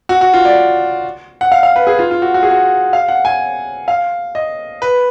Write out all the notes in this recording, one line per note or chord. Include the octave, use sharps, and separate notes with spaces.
F#4
F#4
F4
D5
F#5
F5
F5
B4
G#4
F4
F4
F#4
F#4
G#4
F#4
F5
F#5
G#5
F5
D#5
B4